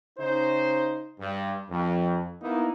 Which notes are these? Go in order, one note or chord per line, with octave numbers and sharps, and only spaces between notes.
C#3 D#4 C5
G2
F2
A#3 B3 D#4 E4